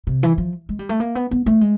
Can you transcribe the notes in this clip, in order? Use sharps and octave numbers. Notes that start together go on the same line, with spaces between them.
C3
E3
F3
G#3
G3
A3
A#3
B3
B3
A3
G#3